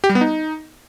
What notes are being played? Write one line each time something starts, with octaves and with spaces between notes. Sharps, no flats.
G4
G3
B3
D#4